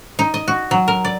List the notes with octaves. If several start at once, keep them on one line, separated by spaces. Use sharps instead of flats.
D#4
D#5
F#4
F#3
A#4
D5